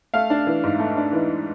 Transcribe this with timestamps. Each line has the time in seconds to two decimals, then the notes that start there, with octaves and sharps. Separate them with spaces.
0.14 A3 F5
0.30 D4
0.47 E3
0.63 G#2
0.79 A3
0.97 D4
1.13 E3